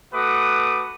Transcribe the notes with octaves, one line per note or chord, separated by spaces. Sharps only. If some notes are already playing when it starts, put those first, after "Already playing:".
A3 F#4 B4 D6 D#6